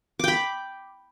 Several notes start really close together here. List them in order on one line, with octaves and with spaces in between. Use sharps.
D6 G5 B5